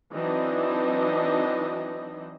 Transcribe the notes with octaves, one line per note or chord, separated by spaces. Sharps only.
E3 F#3 C4 D4 D#4 D#5